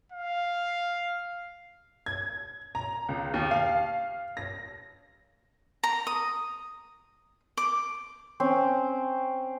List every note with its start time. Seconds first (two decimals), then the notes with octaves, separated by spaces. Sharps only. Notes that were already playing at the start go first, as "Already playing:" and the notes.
0.12 F5
2.06 G#6
2.75 A#5
3.09 C#2
3.34 D#2
3.51 F5
4.37 A#6
5.83 A#5
6.07 D#6
7.57 D6
8.40 C4 C#4 C5